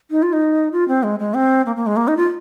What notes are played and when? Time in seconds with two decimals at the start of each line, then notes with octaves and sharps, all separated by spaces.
0.11 D#4
0.23 F4
0.33 D#4
0.72 F4
0.88 C4
1.03 G#3
1.19 G#3
1.34 C4
1.66 A#3
1.76 A#3
1.86 G#3
1.97 A#3
2.08 D#4
2.17 F4